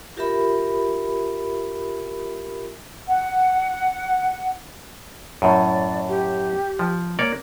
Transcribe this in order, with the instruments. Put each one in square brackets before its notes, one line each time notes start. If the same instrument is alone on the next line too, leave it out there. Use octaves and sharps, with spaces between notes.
[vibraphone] F4 G4 A#4 E5 B5
[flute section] F#5
[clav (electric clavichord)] F#2 A2 [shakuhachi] D5
[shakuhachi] G4
[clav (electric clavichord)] F3
A#3 C#5 D5